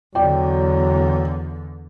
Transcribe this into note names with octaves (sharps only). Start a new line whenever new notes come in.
E2 D3 F#3 D5 G5